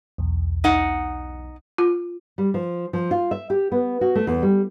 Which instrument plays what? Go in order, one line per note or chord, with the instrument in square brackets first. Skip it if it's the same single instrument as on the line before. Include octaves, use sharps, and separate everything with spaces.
[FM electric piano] B1 E2
[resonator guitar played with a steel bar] D#4 F#5
[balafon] F4
[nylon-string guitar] G3
F3
F3
F4
E5
G4
B3
F#4
A3
E2
G3